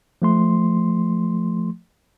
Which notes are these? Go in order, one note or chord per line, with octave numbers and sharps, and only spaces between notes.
F3 A3 C6